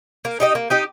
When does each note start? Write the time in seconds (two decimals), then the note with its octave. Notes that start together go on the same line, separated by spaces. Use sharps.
0.25 A#3
0.40 D#4 G4 D#5
0.55 A#3
0.70 D#4 G4 D#5